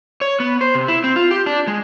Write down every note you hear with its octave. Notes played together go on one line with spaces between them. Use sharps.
C#5
B3
C5
C3
E4
C4
F4
G4
D4
G#3